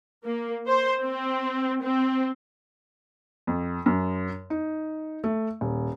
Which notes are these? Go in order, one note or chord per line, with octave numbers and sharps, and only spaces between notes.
A#3
C5
C4
C4
F2
F#2
D#4
A3
D#1